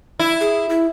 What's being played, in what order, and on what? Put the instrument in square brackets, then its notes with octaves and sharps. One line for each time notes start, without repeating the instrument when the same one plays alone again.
[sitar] E4
[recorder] G#4
E4